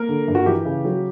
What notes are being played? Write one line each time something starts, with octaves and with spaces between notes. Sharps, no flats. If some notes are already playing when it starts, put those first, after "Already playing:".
Already playing: A#3 A#4
D3
G2
F#4
E3 G4
C#3
F#3